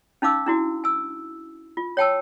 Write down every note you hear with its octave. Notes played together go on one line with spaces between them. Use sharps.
C#4 D#4 F5 D6 E6
D4 E4 F#4
G#5 E6
F4
C#5 G5 A5 E6